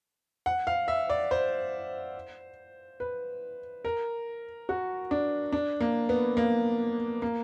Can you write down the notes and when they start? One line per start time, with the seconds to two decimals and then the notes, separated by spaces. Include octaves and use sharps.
0.46 F#5
0.67 F5
0.88 E5
1.10 D5
1.31 C5
3.00 B4
3.85 A#4
4.69 F#4
5.11 D4
5.52 D4
5.80 A#3
6.09 B3
6.37 A#3
7.22 A#3